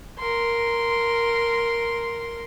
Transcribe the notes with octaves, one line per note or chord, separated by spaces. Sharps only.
A#4 C6